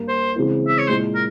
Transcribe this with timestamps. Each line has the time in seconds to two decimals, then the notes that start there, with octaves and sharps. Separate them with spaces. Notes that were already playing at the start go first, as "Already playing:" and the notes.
Already playing: G2 G3 A#3
0.08 C5
0.35 C#3 E3 G#3 C4 E4
0.68 E5
0.78 C#5
0.88 A#2 G#3 E4 C5
1.15 A#4